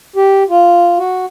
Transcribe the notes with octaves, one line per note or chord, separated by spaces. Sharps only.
G4
F4
F#4